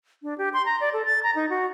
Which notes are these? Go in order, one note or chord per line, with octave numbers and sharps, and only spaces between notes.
D4
G4
C6
A#5
D5
A4
A6
A#5
D#4
F#4